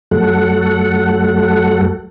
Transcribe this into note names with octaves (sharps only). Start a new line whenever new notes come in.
F#2 F#3 A3 A4 F#5